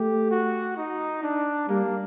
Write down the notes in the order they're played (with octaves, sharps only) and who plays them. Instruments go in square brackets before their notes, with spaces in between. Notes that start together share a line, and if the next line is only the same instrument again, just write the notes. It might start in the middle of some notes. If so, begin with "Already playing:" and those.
Already playing: [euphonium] A3 [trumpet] G4
[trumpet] F#4
D#4
D4
[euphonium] G3 [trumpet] A#3